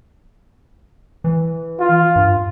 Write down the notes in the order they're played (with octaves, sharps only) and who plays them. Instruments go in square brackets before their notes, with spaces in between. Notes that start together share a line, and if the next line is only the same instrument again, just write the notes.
[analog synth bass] E3
[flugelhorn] F4
[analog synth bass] G2